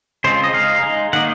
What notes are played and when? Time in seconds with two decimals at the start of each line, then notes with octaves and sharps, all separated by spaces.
0.24 C#3 G#3 C4 F4 C5
0.44 D#5
0.54 G#3 D#4 F5
0.83 G#3 D#4
1.13 D#3 A#3 D#4 F#5